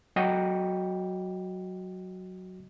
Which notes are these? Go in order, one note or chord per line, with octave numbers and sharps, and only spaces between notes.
F#3 F#4 D#5 G5